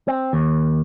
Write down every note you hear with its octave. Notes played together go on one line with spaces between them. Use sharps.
C4
D#2